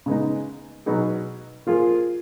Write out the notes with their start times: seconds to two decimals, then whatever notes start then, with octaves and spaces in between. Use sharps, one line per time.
0.06 C#3 G#3 B3 D#4
0.86 B2 F#3 B3 D#4 G#4
1.67 F3 A#3 F4 G#4